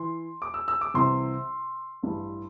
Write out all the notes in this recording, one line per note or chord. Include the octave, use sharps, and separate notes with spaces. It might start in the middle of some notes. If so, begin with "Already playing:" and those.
Already playing: E3 C6
D6
E6
E6
D6
C2 C3 E3 C6
A1 G2 E3